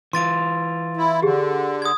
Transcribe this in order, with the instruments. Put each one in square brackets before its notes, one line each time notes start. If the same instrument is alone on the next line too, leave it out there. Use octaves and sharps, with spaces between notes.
[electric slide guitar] E3 F4 [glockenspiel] C6 A6 D7
[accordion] E4
[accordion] D3 [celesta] G4 G#4
[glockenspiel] D#6 G#6